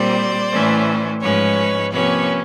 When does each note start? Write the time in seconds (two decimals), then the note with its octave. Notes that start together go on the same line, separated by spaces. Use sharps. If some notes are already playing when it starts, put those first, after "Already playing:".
Already playing: A#2 G3 C4 C5 D5
0.51 A2 E3 A3 C#4
1.21 G#2 F3 G#3 C#4 B4 C#5
1.92 C3 F3 A#3 C#4 B4 C#5